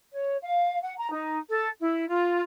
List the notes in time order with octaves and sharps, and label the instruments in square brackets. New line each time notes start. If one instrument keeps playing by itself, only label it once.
[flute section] C#5
F5
F#5
A#5
D#4
A4
E4
F4